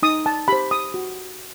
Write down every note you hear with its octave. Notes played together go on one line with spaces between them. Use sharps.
D#4 D#6
A5
G4 C5 B5
D#6
F#4